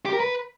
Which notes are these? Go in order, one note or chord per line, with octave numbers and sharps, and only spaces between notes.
G4
A#4
B4